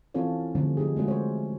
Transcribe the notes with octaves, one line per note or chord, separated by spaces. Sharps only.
E3 C4 C#4 F4 A4 C#5
D3 F3 G3 A3 C4 C#4
F3 D#4 G4 G#4
G#3 A3 C#4 F#4
C5 C#5